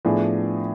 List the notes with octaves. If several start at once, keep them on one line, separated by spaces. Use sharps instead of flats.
A2 F3 B3 D4 G#4